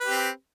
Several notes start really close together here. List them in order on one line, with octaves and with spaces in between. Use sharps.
B4 G4 C4